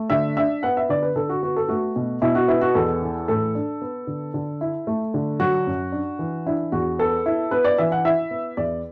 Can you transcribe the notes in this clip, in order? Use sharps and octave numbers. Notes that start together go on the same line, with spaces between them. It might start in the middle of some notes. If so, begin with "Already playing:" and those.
Already playing: A3
D3 E5
D4 E5
B3 F#5
E5
D3 D5
B4
D3 A4
F#4
B3 F#4
A4
A3 F#4
B2
B2 E4
F#4
B3 E4
F#4
E2 A4
E3
A2 A4
D4
B3
D3
D3
E4
A3
D3
F#3 F#4
F#2
D4
E3
D4 E4
E2 F#4
B3 A4
E4
B3 B4
D5
E3 E5
F#5
E4 E5
B3
E2 D5